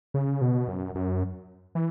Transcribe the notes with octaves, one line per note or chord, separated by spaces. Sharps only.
C#3
B2
F#2
F#2
E3